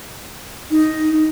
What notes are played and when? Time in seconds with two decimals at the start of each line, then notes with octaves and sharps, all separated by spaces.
0.71 D#4